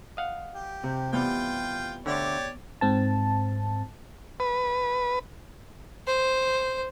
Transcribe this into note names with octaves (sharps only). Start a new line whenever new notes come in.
D#5 F5 F#5
G4
C3
E2 G3 B3 F4 G5
D2 D3 G4 C#5 D5
G#2 C4 A5
B4
C5